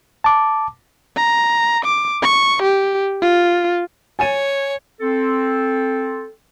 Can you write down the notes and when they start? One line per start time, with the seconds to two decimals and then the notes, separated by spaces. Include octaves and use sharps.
0.24 A5 D6
1.16 A#5
1.85 D6
2.22 C#6
2.62 G4
3.22 F4
4.19 C#5 G#5 A6 D#7
4.99 C4 A4